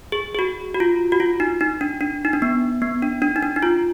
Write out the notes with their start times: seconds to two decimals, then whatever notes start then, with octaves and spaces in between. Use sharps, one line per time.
0.12 G#4
0.35 G#4
0.39 F#4
0.75 F#4
0.80 F4
1.12 F#4
1.20 F4
1.40 D#4
1.61 D#4
1.81 D4
2.01 D4
2.25 D#4
2.33 D4
2.42 B3
2.82 B3
3.02 D4
3.22 D4
3.36 D#4
3.43 D4
3.56 D#4
3.63 F4